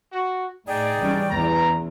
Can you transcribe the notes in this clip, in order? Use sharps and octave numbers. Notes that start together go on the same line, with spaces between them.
F#4
A2 D#4 G#4 D5 G5
E3 G3 C#4
E2 E3 A#5